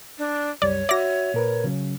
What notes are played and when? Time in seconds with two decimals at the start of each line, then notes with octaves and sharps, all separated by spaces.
0.19 D4
0.62 C2 F#2 G3 C#5 D5
0.89 F#4 D5 E5 A#6
1.34 A#2 A#4 B4
1.64 C#3 F#3 C#4